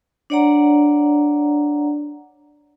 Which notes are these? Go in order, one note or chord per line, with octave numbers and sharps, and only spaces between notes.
D4 C#5 D5 F#5 A#5